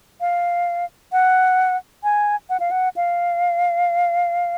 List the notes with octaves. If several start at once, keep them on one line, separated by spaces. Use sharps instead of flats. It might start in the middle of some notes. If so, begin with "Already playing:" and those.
F5
F#5
G#5
F#5
F5
F#5
F5